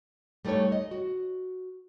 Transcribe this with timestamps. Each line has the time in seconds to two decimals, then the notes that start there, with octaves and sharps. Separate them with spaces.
0.45 G3 A3 D#4 A4 C#5
0.72 D#5
0.91 F#4